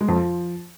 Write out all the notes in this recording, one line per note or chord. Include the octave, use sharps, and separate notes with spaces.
G#3
F2
F3